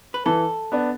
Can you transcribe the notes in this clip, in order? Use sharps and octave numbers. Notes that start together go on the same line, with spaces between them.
B4
E3 A4
B3 D4